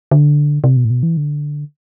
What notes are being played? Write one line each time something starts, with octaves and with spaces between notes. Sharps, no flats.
D3
C3
B2
A2
B2
E3
D3